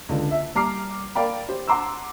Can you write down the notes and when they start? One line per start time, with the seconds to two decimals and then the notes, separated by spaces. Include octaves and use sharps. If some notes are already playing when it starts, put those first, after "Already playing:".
0.09 C#2 D3
0.31 E5
0.55 G3 A#5 D6 F6 C7
1.15 A#4 D5 F5 G5 B5
1.49 G4 C5
1.67 F#5 A#5 C6 D6 E6